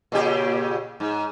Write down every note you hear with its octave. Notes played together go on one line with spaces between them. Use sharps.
A#2 C#3 G4
G#2